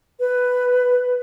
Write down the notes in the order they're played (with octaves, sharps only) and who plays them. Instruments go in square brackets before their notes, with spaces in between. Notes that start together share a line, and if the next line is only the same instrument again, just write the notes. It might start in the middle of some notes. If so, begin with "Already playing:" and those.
[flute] B4